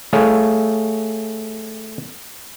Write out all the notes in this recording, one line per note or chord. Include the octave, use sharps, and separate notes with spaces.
A3 G#4 C#5 F5